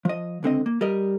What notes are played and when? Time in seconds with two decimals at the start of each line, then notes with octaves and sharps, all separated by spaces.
0.05 F3 D#5
0.43 C#2 D3 C4 D#5
0.66 A#3
0.81 G3 A#4 D#5